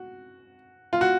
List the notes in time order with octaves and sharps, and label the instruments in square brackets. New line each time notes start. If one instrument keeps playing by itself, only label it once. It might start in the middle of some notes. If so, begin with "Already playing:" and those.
Already playing: [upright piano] F#4
F4
F#4